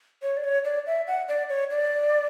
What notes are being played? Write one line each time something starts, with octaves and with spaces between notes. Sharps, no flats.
C#5
D5
C#5
D5
E5
F#5
D5
C#5
D5